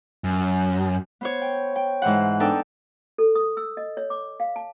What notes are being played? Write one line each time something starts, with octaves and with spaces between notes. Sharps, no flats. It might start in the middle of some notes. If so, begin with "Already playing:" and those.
F#2
B3 C5 C#5
G5
G5
G#2 E3 C5 F#5
B3 D4 D#4 A4 G5
A4
D#6
E6
D#5
C#5
D6
F5
A5